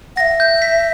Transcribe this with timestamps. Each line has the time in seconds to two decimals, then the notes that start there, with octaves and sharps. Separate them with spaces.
0.16 E5 F#5 A#6
0.40 G6
0.62 B6